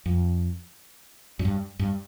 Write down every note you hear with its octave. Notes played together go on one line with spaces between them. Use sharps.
F2
F#2
G2
G2